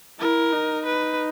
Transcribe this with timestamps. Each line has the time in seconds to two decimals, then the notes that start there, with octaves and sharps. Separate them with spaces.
0.19 E4 A#4
0.52 D#4
0.86 B4